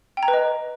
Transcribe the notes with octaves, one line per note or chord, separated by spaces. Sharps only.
G5
A#5
B4
D#5